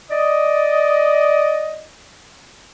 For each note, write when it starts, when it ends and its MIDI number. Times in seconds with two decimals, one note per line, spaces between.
0.11 1.84 74
0.11 1.84 75